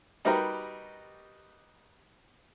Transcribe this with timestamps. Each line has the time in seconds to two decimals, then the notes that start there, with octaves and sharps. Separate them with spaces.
0.25 G3 D#4 F#4 G4 A#4 B4